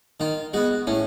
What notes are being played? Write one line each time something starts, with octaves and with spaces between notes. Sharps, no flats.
D#3 F4
G#3 B3 F#4
A2 C#4